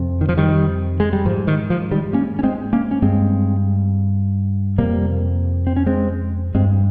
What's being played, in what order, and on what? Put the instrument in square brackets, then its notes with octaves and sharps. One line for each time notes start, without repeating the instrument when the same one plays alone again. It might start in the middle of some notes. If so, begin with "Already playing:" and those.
Already playing: [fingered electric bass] F2 C3
D#3
F3
D#3 G3
G#3
G3
G#2 F3
D#3
F3
D#3 G3
A#3 C#4
C#4
G#3 C4
A#3 C#4
C#4
G2 G#3 C4
F2 C3 G3 A#3
C4
C#4
G#3 C4
G2 G#3 C4